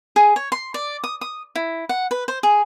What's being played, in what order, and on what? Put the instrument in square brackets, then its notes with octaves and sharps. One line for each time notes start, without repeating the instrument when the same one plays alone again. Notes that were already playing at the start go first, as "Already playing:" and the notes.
[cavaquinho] G#4
C#5
C6
D5
D#6
D#6
E4
F#5
B4
C5
G#4